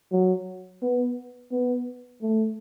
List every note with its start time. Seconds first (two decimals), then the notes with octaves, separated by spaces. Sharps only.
0.12 F#3
0.82 B3
1.52 B3
2.22 A3